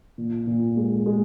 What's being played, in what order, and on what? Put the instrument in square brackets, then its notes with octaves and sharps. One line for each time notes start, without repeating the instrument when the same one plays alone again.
[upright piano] A#2
A#2
G#3
G#3